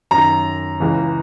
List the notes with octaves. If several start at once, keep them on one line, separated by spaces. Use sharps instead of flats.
F#2 D#3 A#5
C#2 C#3 E3